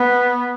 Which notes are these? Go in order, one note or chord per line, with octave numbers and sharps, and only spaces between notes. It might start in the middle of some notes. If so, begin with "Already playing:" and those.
Already playing: B3